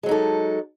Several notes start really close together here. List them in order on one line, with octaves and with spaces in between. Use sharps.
G#3 F#3 D#4 A4